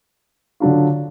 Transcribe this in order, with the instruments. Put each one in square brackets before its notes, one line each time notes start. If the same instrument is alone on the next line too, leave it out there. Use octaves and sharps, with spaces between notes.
[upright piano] D3 F#3 D4 F4